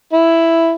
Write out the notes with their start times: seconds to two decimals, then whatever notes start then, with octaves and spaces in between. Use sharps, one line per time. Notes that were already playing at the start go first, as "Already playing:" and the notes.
0.13 E4